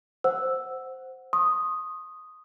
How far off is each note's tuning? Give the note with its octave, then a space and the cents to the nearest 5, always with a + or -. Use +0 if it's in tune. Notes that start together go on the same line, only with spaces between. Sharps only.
C5 +0 F#5 +0 E6 +0
C6 +45 D#6 +0